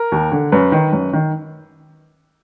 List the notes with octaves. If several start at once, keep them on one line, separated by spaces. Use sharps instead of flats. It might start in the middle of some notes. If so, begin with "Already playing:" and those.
Already playing: A#4
D#2
D3
F#2 B4
D#3
F#2
D#3